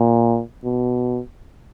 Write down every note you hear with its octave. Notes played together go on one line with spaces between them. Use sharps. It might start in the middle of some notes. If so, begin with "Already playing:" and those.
Already playing: A#2
B2